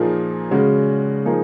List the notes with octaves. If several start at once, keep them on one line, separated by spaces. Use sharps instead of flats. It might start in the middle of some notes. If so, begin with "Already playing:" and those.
Already playing: A#2 F3 A#3 D#4 G#4
C#3 G#3 C#4 F#4
F3 A#3 D#4 G#4